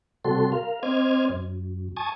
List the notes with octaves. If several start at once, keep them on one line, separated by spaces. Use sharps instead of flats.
C3 G3 F#4 A4 C6
A#4 F5
C4 C5 D#5 D6 F6 G#6
F#2
G#5 A5 C#6 D#6